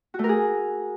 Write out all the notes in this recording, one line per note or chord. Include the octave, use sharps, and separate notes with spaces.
F#4
A3
A#4
G#4